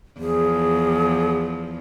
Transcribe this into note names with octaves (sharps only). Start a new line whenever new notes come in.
E2 F3 G#4